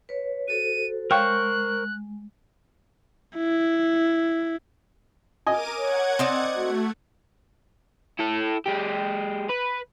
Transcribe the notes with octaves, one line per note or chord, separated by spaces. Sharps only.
B4 C#5
F#4 A4 C5 D#7
G#3 A#4 C5 C#5 F5 G5 C#6 F#6
E4
A#4 D#5 G#5 D6 D#7
C#5 F#5 G#6
C4 D#4 D5
A3 F#4
E4 A4
G#3 G4
B4